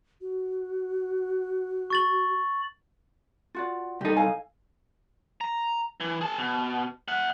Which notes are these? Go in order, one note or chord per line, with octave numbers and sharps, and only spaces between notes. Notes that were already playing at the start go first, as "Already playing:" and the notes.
F#4
C#6 A6 F#7
F4 F#4 D5
C2 D#4 G4 A4
A4 F5 G#5
A#5
E3
G#4 A5
B2
E5 F#5